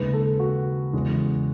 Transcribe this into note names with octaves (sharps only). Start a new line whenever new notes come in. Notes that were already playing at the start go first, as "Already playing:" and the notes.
Already playing: D#2 C#3 G#3 B4
A4
F#4
E2 C#3 G#3